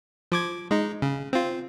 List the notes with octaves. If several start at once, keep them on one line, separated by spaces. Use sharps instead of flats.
F3 D6 G#6
G#3 D#4
C#3
C4 F4